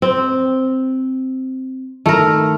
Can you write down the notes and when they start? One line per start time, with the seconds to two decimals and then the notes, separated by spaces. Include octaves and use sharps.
0.02 C4
2.06 D#3 A3 E4 A4 A#4